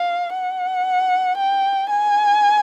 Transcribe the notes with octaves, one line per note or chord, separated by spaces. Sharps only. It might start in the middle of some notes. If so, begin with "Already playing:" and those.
Already playing: F5
F#5
G5
G#5